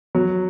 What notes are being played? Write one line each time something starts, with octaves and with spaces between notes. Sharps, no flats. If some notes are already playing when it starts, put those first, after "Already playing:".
F#3